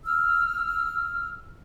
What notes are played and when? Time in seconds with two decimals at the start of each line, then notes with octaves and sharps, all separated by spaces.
0.05 E6 F6